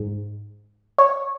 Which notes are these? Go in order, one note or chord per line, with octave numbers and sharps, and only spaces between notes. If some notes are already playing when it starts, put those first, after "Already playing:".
Already playing: G#2
C#5